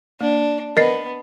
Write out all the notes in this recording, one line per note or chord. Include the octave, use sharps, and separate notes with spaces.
A#3 D4
B3 A#4 D#5 A6 C7